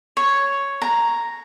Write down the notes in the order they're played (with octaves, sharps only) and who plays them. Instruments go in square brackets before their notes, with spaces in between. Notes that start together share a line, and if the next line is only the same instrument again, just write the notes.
[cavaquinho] C#5
A#5